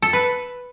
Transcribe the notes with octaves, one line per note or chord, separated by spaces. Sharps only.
A4
B4